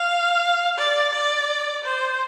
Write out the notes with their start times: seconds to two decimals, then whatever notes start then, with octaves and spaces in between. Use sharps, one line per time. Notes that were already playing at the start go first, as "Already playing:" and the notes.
Already playing: F5
0.78 D5
1.13 D5
1.85 C5